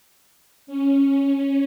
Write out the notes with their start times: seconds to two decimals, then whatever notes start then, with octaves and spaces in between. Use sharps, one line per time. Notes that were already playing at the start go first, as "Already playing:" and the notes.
0.67 C#4